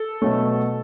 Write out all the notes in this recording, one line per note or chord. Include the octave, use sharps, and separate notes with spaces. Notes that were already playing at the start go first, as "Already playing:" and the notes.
Already playing: A4
B2 F#3 A3 C#4